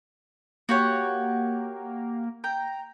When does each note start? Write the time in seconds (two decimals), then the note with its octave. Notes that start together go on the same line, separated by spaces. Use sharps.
0.69 A#3 F#4 G4 C#5
2.44 G5 A#5